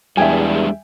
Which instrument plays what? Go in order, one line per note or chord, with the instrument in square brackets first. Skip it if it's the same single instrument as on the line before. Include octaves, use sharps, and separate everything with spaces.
[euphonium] E2 [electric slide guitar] G3 G#3 D4 [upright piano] E5 G5 [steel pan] G#5